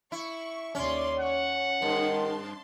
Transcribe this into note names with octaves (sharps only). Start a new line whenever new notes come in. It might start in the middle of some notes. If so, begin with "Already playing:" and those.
E4 C#6
D#2 C#4 D5 C6
C#5 F#5
G2 D#3 A5 C6